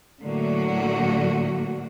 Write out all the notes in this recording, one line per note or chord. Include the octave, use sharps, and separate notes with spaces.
A2 D3 F#3 A#3 F#4